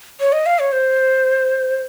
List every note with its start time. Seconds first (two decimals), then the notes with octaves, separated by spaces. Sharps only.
0.20 C#5
0.32 D#5
0.46 F5
0.59 C#5
0.72 C5